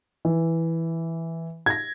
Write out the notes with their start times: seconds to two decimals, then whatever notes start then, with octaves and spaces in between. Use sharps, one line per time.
0.25 E3
1.66 G#6 A#6